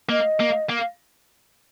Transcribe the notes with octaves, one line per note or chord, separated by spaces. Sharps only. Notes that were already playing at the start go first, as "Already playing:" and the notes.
A#3 D#5
A#3
A#3